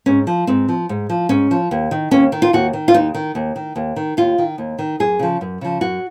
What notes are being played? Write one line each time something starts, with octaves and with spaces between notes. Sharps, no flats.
G#2 C#4
F3
G#2 C4
F3
G#2
F3
G#2 C#4
F3
D#2
D#3
D#2 C#4
D#3
F4
D#2 F#4
D#3
F4
D#2 D#4
D#3
D#2
D#3
D#2
D#3
D#2 F4
D#3
D#2
D#3
F#2 G#4
C#3 F3
F#2
C#3 F3
F#2 F#4